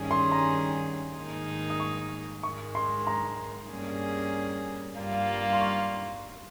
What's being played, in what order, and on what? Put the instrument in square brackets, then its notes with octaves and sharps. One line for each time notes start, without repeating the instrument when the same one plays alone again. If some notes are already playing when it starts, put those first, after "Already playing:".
Already playing: [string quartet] G2 D#3 G3 C#4 G#4
[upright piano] C6
A#5
[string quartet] G#2 D#3 A#3 D#4 G#4
[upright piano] D#6
C#6
[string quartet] G#2 D#3 G#3 [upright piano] C#6
[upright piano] C6
A#5
[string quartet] G2 G3 A#3 C#4 G#4
G2 G3 A#3 F4
[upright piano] C6
C#6